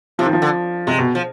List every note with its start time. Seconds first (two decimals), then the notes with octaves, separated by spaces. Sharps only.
0.19 C3 F3
0.26 D#3
0.33 F3
0.42 D3
0.87 C3 G#3
0.99 B2
1.15 F3